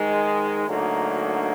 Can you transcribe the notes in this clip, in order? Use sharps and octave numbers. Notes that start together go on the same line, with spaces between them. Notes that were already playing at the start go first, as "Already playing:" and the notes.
Already playing: G#2 D#3 G#3
D2 D3 F#3 A#3 D#4